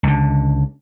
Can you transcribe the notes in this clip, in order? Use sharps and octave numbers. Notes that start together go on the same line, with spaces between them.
C#2 D3